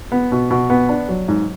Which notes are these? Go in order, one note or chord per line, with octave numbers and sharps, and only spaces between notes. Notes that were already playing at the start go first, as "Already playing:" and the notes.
B3
B2
B2
B3
D4
F#3
G#2